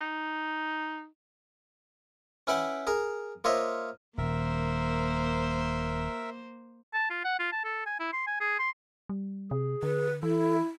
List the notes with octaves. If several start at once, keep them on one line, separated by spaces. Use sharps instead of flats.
D#4
C#4 E4 B4 F#5 G5
G#4 A#4 A#5
A#3 F4 C5 C#5 D#5 E5
D#1 A#3 A#4 C5 E5
A5
F4
F#5
F4
A5
A4
G#5
E4
C6
G#5
G#4
C6
G3
C3 G#4
D3 B4
E3 E4 A4